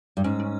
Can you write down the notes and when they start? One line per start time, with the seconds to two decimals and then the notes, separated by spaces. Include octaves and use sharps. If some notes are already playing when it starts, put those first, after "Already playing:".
0.17 G2
0.24 G#2 C#4
0.40 C#4